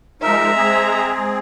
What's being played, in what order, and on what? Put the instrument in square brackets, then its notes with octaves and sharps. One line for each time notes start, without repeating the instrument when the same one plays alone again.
[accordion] F3 D#4 A#4 [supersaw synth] G#3 A#5 [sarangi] E5
[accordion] C4 G#4